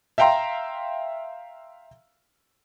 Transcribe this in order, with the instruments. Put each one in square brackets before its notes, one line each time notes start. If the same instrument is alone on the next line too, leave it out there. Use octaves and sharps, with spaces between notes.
[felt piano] E5 F5 G5 A#5 C6